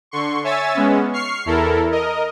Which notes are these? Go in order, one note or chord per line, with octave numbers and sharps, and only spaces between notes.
D3 C6 C#6
C#5 E5 G#5 E6 A6
G#3 B3 C#4
C#6 F6 C7
E2 E4 A4 A#4
A#4 D#5